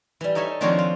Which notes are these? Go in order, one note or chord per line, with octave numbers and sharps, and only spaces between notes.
E3 G3
D#4 A4 C#5 E5 G#5
D#3 F3 C4 D4 F#4 C#5
F4